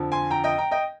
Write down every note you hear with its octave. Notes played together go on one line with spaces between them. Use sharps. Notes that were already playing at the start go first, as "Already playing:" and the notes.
Already playing: F2 D3 F3
G#5 C6
G5 A#5
D#5 G5
G5 A#5
D#5 G5